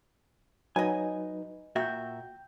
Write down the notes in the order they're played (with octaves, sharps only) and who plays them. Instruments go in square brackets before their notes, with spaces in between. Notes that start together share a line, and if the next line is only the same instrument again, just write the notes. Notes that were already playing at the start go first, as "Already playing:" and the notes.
[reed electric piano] F#3 D#4 B4 [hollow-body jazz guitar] D#5 G#5
[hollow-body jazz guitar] A#2 F#4 E5 [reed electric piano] G5 G6